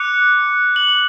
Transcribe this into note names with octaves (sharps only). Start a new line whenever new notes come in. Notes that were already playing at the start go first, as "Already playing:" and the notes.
Already playing: D6 F#6 C#7
F#7